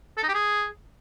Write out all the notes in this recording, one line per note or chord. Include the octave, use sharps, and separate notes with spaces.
A4
D#4
G4
G#4